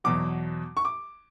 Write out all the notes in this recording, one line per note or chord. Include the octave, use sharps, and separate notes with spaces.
E2 B2 F#3 D6
C#6
D6